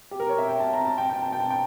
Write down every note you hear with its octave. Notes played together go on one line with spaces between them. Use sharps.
G4
A#4
C#5
E5
G5
A5
A#5
A5
G5
G5
A5
G5
A5
G5